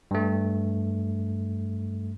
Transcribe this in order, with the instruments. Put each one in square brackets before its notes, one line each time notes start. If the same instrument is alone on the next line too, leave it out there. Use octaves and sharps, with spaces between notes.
[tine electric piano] G2 A3